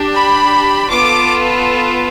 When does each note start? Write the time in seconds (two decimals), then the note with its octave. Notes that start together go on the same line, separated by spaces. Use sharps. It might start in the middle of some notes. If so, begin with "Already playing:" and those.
Already playing: D4 G4
0.15 B5
0.90 B3 F4 A4 D6